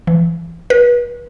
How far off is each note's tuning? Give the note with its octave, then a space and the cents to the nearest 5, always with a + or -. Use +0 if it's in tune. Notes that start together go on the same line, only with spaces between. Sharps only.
E3 +30
B4 -35